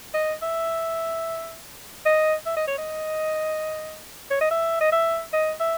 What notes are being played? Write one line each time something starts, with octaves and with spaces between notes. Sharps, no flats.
D#5
E5
D#5
E5
D#5
C#5
D#5
C#5
D#5
E5
D#5
E5
D#5
E5